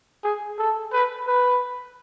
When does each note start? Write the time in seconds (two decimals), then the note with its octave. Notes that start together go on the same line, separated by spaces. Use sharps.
0.24 G#4
0.58 A4
0.92 B4
1.27 B4